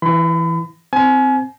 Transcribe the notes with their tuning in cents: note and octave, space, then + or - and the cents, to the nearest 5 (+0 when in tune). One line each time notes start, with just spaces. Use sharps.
E3 +0 B5 +35
C4 -10 G#5 +30